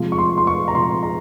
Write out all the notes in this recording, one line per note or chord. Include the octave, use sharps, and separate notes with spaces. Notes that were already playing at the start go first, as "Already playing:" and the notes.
Already playing: C3 F3 G#3
C#6
C6
C6
C#6
A#5
C3 F3 G#3 C6
A#5